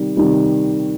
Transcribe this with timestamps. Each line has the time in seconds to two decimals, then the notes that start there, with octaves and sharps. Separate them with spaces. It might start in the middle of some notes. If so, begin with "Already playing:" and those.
Already playing: C3 D#3 G3
0.17 C3 D#3 G3